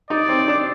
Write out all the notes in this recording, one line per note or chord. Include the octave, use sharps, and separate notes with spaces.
D#4 D5
C4
D4